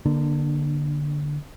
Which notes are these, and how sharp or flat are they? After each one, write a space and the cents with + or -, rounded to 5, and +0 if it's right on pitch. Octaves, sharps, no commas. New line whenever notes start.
D3 +0 A#3 +30 D4 +25